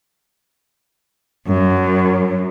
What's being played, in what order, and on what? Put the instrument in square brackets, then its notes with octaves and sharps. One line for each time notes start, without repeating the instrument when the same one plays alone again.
[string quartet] F#2